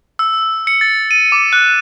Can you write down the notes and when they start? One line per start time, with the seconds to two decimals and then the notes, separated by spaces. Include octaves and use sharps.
0.19 E6
0.67 C#7
0.81 A6
1.11 D#7
1.32 D6
1.53 F#6